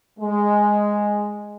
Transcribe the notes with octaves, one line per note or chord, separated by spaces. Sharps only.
G#3